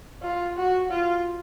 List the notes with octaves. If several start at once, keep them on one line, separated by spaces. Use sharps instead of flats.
F4
F#4
F4